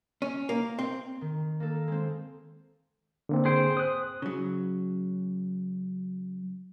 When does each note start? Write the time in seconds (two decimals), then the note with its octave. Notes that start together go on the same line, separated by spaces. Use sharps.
0.22 C#4
0.49 A#3
0.79 C4
1.21 D#3
1.60 A#3 D#4 A4
1.88 G#3 C4
3.29 D3 A#3 C4
3.45 G#4 C5 G5
3.77 C5 D#6 F#6
4.22 C#3 F#3